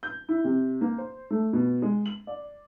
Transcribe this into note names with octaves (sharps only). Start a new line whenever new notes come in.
G6
E4
C3
A#3
C5
A3
B2
G#3
F#7
D5